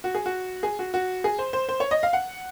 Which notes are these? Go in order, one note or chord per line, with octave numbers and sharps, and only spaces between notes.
F#4
G#4
F#4
G#4
F#4
F#4
G#4
C5
C5
C5
C#5
D#5
F5
F#5